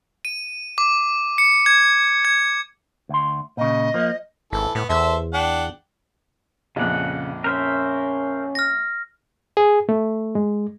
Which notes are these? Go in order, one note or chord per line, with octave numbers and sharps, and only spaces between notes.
D#7
D6
C#7
G#6
G#6
D2 C6
A#2 C#3 D#5
F3 A#3
G#1 E3 A4
A2 B3
E2 A4 C5 E5
D4 F#5 G5
A#1 F2 C#3 F#5
C#4 A#4 C5 E5
F6 A#6
G#4
A3
G#3